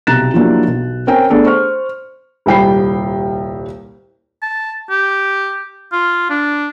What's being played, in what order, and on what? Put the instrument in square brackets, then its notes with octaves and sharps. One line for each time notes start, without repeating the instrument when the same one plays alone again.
[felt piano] B1 C3 A#5 F#6 A6 E7
F3 F#3 A#3 D4 E4 G4
B1
C4 C#4 A#4 G5 G#5
A3 B3 D4 G#4 A4
C5 C#6 F6
D#1 C2 G3 G5 B5 C7
[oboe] A5
G4
F4
D4